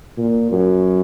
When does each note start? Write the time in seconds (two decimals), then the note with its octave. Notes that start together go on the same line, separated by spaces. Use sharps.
0.18 A#2
0.52 F#2